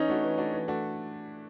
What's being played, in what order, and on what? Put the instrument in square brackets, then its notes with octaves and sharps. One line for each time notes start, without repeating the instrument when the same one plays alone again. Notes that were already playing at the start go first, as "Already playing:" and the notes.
Already playing: [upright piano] E3 [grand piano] C#4 D#4
[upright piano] A3 D4 F#4
E3
A3 D4 F#4
E3
A3 D4 F#4